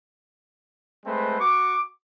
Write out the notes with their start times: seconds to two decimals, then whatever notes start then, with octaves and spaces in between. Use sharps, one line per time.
1.06 G#3 A3 C4 B4 C5
1.40 F#4 C#6 D6